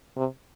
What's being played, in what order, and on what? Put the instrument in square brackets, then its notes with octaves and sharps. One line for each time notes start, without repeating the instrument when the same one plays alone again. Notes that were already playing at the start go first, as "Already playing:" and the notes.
[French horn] C3